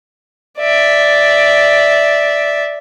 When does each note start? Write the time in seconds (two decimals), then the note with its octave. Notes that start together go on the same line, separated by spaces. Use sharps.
0.59 D5 E5